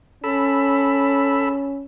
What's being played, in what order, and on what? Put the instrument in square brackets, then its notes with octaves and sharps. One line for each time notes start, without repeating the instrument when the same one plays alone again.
[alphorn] C#4 [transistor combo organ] A4 B5 E6